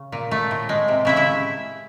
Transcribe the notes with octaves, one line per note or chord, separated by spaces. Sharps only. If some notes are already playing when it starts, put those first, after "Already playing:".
Already playing: C#3
A#2
A3
A2
G#3
C3
C#3 E4 E5
E4 E5